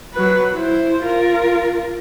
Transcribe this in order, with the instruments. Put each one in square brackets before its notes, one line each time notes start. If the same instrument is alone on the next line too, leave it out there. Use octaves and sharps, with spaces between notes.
[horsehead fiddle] F#3 B4
E4 C5
F4 A#4